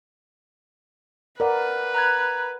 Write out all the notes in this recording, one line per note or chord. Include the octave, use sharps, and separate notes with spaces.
A#4 B4 D5 F#5
A#5 F#6 G#6